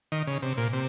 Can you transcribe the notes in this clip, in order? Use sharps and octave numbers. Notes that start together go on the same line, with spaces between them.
D#3
C#3
C3
A#2
C3